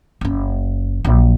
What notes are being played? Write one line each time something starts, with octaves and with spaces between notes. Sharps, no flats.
F#1 C#4
A#1 F#3